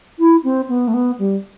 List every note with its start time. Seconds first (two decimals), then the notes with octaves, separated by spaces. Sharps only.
0.19 E4
0.44 C4
0.69 B3
0.88 A3
0.94 B3
1.19 G3